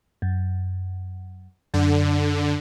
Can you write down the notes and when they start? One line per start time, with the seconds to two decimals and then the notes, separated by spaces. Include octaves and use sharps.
0.22 F#2
1.74 F#2 D3